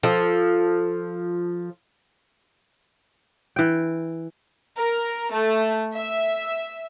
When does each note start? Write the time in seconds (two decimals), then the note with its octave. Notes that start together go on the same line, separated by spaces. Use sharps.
0.03 F3 A4
3.56 E3 G5
4.77 A#4
5.34 A3
5.95 E5